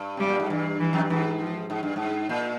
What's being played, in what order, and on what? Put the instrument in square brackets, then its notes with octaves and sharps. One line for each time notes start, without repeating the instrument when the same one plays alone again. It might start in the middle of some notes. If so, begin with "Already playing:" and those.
Already playing: [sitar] G2
[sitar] C3 [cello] G3
[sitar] A#2
G#2
[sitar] G2 [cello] E3
[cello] E3
[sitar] F2
G2
[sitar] G#2 [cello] E3
[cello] F3
[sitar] G#2
G2
G#2
A#2